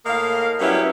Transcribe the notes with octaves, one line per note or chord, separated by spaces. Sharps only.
A2 A#3 D#5 F5
F#3 G3 B3 C#4 E4 G4